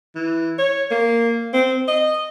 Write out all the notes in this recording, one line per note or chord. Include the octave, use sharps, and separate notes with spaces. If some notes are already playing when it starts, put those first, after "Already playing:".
E3
C#5
A#3
C4
D#5